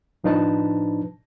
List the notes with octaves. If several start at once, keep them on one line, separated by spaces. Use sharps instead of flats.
A2 F3 D4 D#4 B4 A5